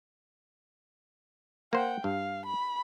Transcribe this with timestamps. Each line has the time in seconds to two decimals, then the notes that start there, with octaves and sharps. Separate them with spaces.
1.73 A#3 C5 F#5 G5
2.04 G2 F5
2.46 B5